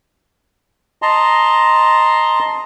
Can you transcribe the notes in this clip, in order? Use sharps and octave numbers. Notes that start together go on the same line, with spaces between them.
D#5 A5 A#5 C6